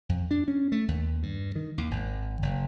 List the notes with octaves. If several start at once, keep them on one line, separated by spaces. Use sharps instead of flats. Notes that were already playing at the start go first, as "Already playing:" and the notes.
F2
D4
C#4
A3
D#2
G2
D#3
D#2
G#1
F#1